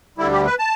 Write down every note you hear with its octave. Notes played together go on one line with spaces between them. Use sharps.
D2 D3 G3 E4
G4
B4
A5